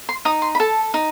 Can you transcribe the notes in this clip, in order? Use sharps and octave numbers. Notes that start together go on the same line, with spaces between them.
C6
D#4 D#6
C6
B5
A4 A5
D#4